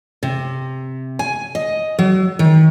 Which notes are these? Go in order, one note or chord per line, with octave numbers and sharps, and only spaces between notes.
C3
G#5
D#5
F#3
D#3